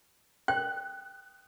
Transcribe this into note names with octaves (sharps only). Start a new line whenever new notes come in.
G5 F#6